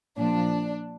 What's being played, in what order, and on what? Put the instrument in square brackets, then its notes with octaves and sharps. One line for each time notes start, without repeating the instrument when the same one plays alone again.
[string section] A#2 F3 D4